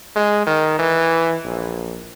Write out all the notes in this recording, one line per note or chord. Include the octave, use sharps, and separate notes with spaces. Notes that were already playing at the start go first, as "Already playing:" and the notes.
G#3
D#3
E3
A#1